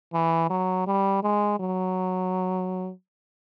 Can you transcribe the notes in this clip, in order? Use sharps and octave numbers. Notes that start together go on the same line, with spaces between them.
E3
F#3
G3
G#3
F#3